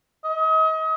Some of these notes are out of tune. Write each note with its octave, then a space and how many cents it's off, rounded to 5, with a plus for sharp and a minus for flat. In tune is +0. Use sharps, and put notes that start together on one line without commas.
D#5 +35